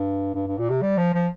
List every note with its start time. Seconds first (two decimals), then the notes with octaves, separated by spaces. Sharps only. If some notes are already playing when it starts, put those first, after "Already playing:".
Already playing: G2
0.35 G2
0.47 G2
0.58 A#2
0.70 C3
0.82 G3
0.97 F3
1.14 F3